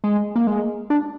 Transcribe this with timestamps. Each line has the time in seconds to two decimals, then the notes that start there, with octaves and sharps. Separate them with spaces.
0.04 G#3
0.36 A#3
0.47 G#3
0.90 D4